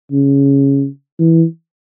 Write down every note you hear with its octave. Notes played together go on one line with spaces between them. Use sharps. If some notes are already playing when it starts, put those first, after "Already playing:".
C#3
E3